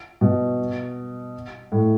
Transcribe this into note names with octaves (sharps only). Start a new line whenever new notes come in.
B2
A2